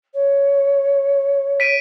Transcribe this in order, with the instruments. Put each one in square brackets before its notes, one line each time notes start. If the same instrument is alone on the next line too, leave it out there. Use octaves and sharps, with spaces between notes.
[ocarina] C#5
[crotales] B6 D7 D#7